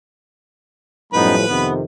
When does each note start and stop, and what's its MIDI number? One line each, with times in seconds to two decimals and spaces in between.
1.13 1.35 42
1.13 1.43 45
1.13 1.43 53
1.13 1.43 55
1.13 1.35 59
1.13 1.35 63
1.13 1.66 71
1.13 1.66 83
1.47 1.84 41
1.47 1.84 48
1.47 1.84 51
1.47 1.73 59